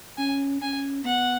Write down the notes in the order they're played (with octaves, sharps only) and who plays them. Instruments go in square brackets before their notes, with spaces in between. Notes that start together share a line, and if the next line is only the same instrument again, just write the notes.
[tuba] C#4 [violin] G#5
[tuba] C#4 [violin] G#5
[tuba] B3 [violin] F#5